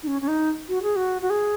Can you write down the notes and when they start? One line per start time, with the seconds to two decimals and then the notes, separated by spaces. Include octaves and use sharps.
0.03 D#4
0.07 C#4
0.21 C#4
0.28 D#4
0.69 F#4
0.83 G#4
0.96 F#4
1.22 F#4
1.30 G#4